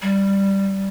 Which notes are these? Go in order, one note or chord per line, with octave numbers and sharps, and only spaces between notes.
G3